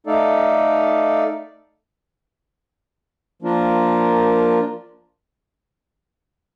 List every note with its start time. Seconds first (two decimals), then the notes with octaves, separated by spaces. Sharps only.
0.07 A3 D#4 A4 D5 F5
3.42 F3 A#3 D4 F4 A#4